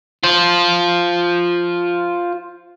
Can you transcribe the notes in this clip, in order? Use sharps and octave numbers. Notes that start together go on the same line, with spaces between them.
F4 C5